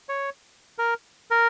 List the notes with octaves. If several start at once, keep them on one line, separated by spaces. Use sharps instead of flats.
C#5
A#4
A#4